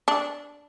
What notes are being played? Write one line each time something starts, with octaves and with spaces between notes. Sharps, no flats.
D4